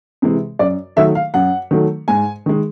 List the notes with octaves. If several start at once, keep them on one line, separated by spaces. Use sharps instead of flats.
C3 E3 G#3
F#2 D5
D#3 F#3 A3 E5
F5
F#2 F#5
D#3 F#3 A3
G#2 G#5
D#3 G#3